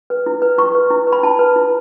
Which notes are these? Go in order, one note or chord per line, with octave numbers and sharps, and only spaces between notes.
B4
E4
B4
E4 C#6
B4
E4
B4
B5
E4 A5
B4
E4